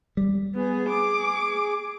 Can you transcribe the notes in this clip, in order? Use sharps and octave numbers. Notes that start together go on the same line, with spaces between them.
G3
B3 G#4
D6